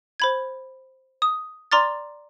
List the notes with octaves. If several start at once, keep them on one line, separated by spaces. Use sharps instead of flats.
C5 B5 G#6
D#6
D5 A#5 C6 D6 F6 A6